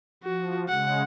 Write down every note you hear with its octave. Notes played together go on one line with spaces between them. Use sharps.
F3 F#4
C#3 G#3 F#5